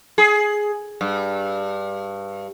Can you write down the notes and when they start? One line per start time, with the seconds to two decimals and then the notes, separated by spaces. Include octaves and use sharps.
0.18 G#4
1.01 G2